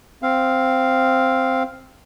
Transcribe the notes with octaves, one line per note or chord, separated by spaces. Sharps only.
C4 F5